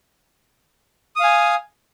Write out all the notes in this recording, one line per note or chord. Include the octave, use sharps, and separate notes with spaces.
F5 G#5 D#6